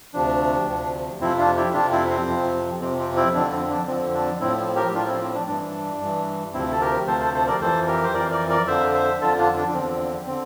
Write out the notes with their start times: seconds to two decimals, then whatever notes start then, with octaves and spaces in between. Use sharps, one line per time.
0.14 D2 C3 F3 D4
0.67 D2 C3 F3
1.20 F2 C3 F3 C4 E4
1.39 D4 F4
1.56 E4 G4
1.74 F2 C3 F3 D4 F4
1.92 C4 E4
2.10 C4
2.28 F2 C3 F3
2.81 F2 C3 F3 C4
2.98 C4
3.16 C4 E4
3.34 F2 D3 F3 D4
3.52 C4
3.70 D4
3.87 F2 D3 F3 C4
4.14 D4
4.40 A2 F3 C4 E4
4.76 G4 A#4
4.88 G4
4.94 A2 F3 D4 F4
5.07 C4 E4
5.21 C4
5.34 D4
5.47 G2 E3 D4
6.01 G2 E3
6.54 D2 C3 F3 C4 E4
6.72 A4
6.81 G4 A#4
7.07 D2 C3 F3 A4 C5
7.20 A4 C5
7.34 A4 C5
7.47 A#4 D5
7.61 F2 E3 A4 C5
7.87 G4 A#4
8.04 C5
8.14 F2 E3 A#4 D5
8.31 A#4 D5
8.49 A#4 D5
8.67 F2 D3 F3 C5 E5
8.94 C5 E5
9.21 F2 D3 F3 F4 A4
9.38 D4 F4
9.57 D4
9.68 D4
9.74 E2 D3 F3 C4
10.27 D3 C4